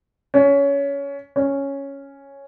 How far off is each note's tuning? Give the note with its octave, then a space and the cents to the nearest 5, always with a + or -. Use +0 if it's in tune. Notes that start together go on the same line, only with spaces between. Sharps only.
C#4 +20
C#4 +0